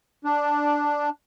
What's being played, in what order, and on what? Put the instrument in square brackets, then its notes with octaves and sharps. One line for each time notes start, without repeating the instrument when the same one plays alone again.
[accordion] D4